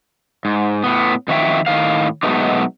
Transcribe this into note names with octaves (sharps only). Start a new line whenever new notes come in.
G#2
A2 B3
F2 D#3 F#3 C#5 E5 G5
A2 D#3 A#3 F5
B2 F#3 G#3 A3 B3 D#4